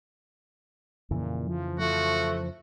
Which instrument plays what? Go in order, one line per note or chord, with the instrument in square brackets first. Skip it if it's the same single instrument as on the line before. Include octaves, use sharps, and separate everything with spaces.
[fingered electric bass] F2 C#3 E3 [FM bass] A#2
[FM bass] F3
[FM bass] F3 [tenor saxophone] A3 [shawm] F#4